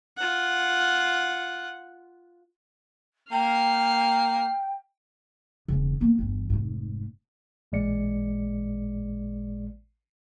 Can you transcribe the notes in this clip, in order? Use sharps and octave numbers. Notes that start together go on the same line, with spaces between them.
F4 F#5
A#3 G5 F6 C7
E1 C#3
A#3 B3
G1 E2
F1 G#2
A1 A#2 G#3 D5 C#7